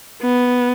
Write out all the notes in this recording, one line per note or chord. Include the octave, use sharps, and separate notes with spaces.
B3